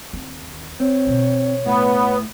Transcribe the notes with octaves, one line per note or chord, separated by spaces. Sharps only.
D#2 C4
C4 C#5
B2 D3
A2 B3